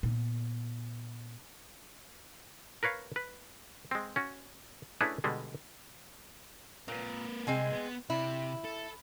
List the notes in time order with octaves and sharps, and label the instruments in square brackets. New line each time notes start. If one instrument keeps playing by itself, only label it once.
[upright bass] A#2 B3
[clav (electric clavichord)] A#4 B4 C#5 F5
B4
G#3 C4
C#4 F#4
A3 C#4 D4 E4 G#4 B4
B2 D3 G3 G#3
[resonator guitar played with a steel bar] A#2 [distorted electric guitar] A#3 B4
[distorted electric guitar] C2 [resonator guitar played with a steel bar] G#3 C4 G#5
[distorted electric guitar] B3
[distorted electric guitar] C3 [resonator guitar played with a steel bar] E4
[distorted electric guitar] A4